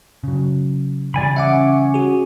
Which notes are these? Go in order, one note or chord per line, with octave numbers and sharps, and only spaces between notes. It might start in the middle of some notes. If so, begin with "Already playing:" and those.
C#3 F#3
C#3 E3 G3 D5 G#5 B5
C#4 E5 F#5 D6
F#4 G#4